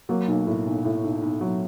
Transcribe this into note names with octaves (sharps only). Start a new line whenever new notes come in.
F#3 A#3
B1
A2
B1
A2
B1
B1
F#3